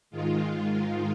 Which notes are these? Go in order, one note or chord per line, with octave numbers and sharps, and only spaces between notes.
G#2 D#3 G#3 F4